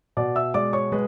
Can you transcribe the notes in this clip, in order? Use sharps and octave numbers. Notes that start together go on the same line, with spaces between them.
B2 D5 D6
E5 E6
G#3 D5 D6
C#5 C#6
G#3 B4